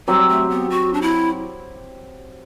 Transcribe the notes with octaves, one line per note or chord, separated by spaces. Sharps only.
F#3 G3 C4 G4
A3
B3
F#4
D4
E4